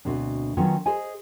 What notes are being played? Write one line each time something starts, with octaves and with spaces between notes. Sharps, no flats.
D2 B2 C4 D4
D#3 F#3 B3 C#4 F4
G#4 C5 D#5 G#5